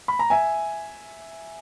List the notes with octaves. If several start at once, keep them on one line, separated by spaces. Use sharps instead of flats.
B5
A#5
E5 G#5